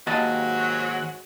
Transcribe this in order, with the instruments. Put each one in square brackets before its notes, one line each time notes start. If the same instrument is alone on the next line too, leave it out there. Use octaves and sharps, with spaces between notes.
[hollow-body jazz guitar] D#2 D#5 A5 [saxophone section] G#2 F#3 F#4